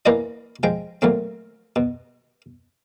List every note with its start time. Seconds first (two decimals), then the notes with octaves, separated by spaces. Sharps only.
0.06 E3 A#3 E4 B4 D5 D#5
0.63 F3 G#3 G5
1.02 A#2 F#3 A3 C4
1.76 B2